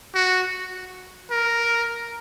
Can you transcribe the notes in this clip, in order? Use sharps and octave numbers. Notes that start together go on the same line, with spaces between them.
F#4
A#4